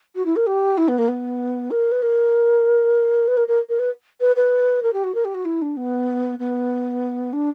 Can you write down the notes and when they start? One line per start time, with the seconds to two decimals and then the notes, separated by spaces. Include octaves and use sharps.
0.15 F#4
0.25 E4
0.36 A#4
0.47 G4
0.78 E4
0.88 B3
0.98 A#3
1.08 B3
1.71 A#4
1.92 B4
2.02 A#4
3.28 B4
3.37 A#4
3.48 A#4
3.69 A#4
3.79 B4
4.21 B4
4.36 B4
4.83 A#4
4.93 G4
5.04 F#4
5.15 A#4
5.25 G4
5.34 F#4
5.45 E4
5.62 D4
5.77 B3
6.39 B3
7.33 D4